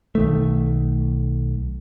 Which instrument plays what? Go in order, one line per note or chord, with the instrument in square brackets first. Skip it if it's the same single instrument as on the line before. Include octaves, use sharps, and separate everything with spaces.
[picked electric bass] B1 D#3 A3